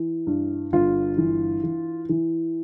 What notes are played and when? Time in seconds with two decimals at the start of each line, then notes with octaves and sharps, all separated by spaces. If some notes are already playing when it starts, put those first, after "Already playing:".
Already playing: E3
0.27 G2
0.73 G1 F4
1.18 E3
1.63 E3
2.09 E3